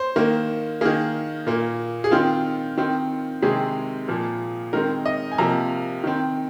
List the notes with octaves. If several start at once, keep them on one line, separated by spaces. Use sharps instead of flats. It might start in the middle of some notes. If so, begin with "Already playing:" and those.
Already playing: C5
D#3 A#3
D#3 A#3 G#4
A#2 A#3
G#4
D#3 C4 F4
D#3 C4
C3 D#3 G#3 C4 G#4
A#2 F3 A#3
D#3 G#3 C4 A#4
D#5
G#5
C3 F3 A#3 A#5
D#3 C4